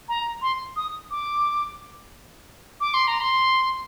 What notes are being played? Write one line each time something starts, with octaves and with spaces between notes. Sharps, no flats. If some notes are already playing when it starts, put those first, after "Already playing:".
A#5
C6
D#6
D6
D6
C6
A#5
C6